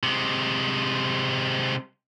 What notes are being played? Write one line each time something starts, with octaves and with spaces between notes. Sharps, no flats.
C3 G#3